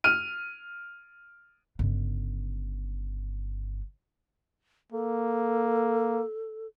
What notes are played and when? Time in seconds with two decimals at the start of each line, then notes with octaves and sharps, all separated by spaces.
0.04 F6 D#7
1.79 G1 C#3
4.92 A#3 A4